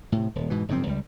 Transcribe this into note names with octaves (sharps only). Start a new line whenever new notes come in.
A2 C3
D#1
G#2 B2 E3
F#1 G#2 F3 C4
C#2 G3